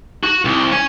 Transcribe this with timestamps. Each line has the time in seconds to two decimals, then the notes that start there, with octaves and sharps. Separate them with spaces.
0.23 F#4
0.45 C2
0.72 C#5 G#5